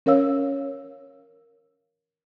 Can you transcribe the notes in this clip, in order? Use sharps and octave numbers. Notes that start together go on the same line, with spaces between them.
C#4 A#4 C#5 F5 E6